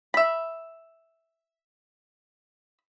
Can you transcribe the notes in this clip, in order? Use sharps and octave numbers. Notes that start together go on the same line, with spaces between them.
E5 B5